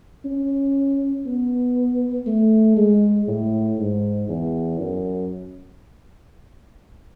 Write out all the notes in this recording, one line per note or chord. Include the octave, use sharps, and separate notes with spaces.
C#4
B3
A3
G#3
A2
G#2
E2
F#2